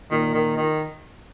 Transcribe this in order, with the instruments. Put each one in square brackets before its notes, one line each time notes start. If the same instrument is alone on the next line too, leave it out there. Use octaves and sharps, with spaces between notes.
[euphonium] A#2 [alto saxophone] D#3
[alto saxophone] D#3
D#3